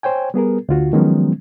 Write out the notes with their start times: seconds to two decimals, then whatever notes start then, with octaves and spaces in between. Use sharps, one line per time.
0.03 C5 C#5 G5 G#5
0.34 G3 B3 G#4 A#4
0.69 D2 D3 F4 F#4
0.93 D#3 F3 F#3 G#3 B3 C#4